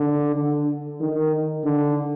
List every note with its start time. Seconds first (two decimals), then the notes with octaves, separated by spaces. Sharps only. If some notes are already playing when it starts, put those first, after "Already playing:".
Already playing: D3
0.36 D3
1.01 D#3
1.64 D3